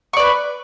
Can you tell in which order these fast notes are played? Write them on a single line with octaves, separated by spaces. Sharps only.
C#6 D5 B4